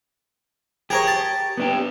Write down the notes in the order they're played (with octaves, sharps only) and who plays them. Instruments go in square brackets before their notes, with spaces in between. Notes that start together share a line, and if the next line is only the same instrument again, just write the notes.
[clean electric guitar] G4 [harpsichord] G#4 A#4 C#5
[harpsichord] A5
[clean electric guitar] B3 D4 G4